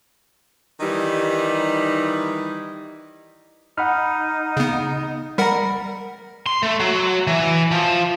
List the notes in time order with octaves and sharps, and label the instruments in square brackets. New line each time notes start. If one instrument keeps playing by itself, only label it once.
[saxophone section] D#3 E3 G3 D#4
[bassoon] D#4 [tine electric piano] F#5 B5 F6
[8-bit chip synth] C#3 B3
[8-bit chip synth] G3 A#4 F#5 [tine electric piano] A#5 B5
[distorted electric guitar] C6
A3
F#3
E3
F3